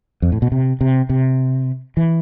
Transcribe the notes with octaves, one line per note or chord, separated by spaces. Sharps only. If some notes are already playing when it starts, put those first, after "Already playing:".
F2
A2
B2
C3
C3
C3
E3